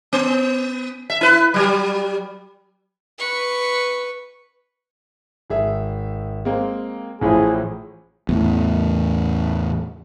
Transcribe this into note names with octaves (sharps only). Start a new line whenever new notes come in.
B3
E5
E4 B4
F#3 G3
B4 C#6
G#1 G#4 E5
G#3 A#3 C4
A1 A2 F3 G#4
E2 A2